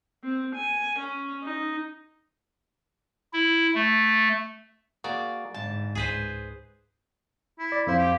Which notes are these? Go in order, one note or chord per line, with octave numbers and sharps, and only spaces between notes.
C4
G#5
C#4
D#4
E4
A3
A#3 F#4 G#4 D5
G1 G#2 A5
C#2 G#4 B4 C5
E4 B5
D5
F2 E4 C5 F5
G4